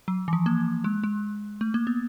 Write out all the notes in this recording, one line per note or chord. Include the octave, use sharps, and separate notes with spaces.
F#3
E3
F3
A#3
G#3
G#3
A3
A#3
B3